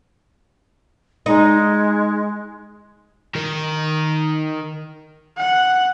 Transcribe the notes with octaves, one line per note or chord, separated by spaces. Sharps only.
G#3 D#4
D#3 A#4
F#5